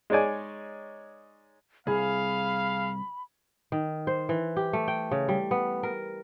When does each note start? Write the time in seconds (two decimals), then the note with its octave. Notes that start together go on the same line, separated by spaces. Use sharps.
0.10 G#3 D#4 C#5 D5 G#5
1.87 C2 G#4 F5 B5
3.72 D#3
4.07 C5
4.29 E3
4.56 G4
4.73 A3
4.88 G5
5.11 C#3
5.29 G3
5.51 B3
5.83 A#4